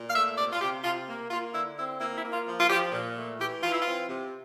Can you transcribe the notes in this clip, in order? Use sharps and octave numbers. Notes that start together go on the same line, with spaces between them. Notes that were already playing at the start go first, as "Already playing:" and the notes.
Already playing: A#2
F5
A3 E5
C3 D5
F4
C3 G4
C3 F4
A#3
A#3 F4
D3 E4
C4 E4
A#3 E4
E4
A#3
F4
F3
F4
F3 G4
A#2
A3
E3 G4
E3 F4
E4
C4 F4
C3